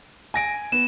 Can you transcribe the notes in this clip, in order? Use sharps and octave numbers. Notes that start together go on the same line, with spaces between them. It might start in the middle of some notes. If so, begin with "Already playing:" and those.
G#5 A#6 D7
B3 E7